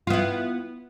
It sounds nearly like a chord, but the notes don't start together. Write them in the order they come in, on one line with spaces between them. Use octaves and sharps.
F4 B3 E4